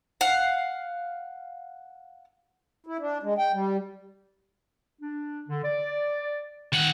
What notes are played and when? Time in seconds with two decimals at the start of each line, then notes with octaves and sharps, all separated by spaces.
0.21 F5 F#5
2.87 E4
2.99 D4
3.23 G#3
3.38 G5
3.53 G3
5.02 D4
5.49 D3
5.65 D5
6.72 D#3 F#5